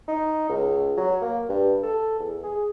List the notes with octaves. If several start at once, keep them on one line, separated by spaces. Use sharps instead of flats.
D#4
C#2
F#3
A#3
G2
A4
E2
G#4